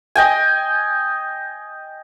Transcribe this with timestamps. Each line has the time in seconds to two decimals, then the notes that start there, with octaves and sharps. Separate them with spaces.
0.15 D#5 G5 G#5